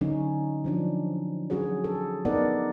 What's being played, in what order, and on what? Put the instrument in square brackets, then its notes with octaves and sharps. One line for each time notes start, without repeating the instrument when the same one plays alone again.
[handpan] D3 F#3 C#4 D#4
F3 F#3 D4
F#3 C#4 F#4 G#4 C#5
A4
B3 D#4 A4 A#4 D5 F#5